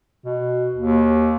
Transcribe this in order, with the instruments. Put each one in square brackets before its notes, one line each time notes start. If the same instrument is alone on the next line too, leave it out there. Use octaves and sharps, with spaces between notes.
[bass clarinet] B2
D#2